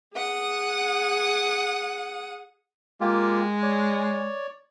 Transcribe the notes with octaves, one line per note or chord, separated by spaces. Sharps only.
G#4 F#5 D#6
G#3 A#3 F4 G4
C#5 D5